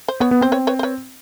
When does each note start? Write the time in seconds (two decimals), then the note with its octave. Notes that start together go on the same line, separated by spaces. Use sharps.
0.08 C5
0.20 B3 B4 C#5
0.31 B3
0.41 C4 C5
0.52 B4 C#5
0.67 B4 C#5
0.79 C5
0.83 B4 C#5